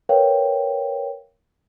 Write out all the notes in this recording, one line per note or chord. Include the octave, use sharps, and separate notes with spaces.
A#4 B4 C#5 F5 G5